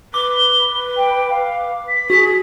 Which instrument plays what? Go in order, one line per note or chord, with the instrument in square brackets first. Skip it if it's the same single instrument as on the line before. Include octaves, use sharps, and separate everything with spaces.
[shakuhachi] B4 [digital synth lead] D6 [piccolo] G7
[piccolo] G5
F5
B6
[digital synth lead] F#4 [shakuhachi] G#4